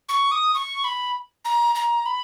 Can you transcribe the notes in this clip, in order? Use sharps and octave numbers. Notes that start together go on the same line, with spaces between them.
C#6
D#6
C#6
B5
A#5
A#5
B5